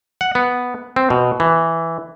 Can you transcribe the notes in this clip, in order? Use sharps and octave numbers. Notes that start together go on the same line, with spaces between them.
F#5
B3
C4
B2
E3